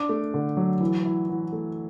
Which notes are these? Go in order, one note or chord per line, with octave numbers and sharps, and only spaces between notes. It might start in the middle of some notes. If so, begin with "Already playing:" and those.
Already playing: D4 D6
A3
D3
F#3
E3
E4
E3
A3